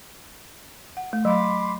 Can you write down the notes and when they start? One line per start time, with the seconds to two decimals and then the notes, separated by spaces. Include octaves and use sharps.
0.97 F#5
1.13 A3
1.25 F#3 F5 B5 C6 D6